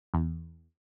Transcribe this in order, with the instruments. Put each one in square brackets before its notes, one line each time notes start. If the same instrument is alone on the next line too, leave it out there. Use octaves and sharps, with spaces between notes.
[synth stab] E2